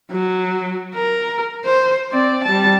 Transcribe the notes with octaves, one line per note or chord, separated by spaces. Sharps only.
F#3
A#4
C5
C4 D5
G3 A5